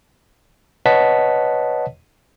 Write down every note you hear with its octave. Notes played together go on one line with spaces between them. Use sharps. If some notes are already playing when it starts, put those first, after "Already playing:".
B4 C#5 D#5 F#5 A5 B6